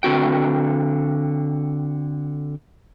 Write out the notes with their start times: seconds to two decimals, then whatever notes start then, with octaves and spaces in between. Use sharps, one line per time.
0.03 D3 C4 F#4 G5